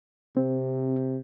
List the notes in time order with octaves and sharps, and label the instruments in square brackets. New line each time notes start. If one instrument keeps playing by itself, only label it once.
[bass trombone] C3 [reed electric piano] C4